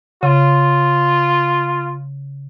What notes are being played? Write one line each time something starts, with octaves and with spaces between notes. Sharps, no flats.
C#3 F4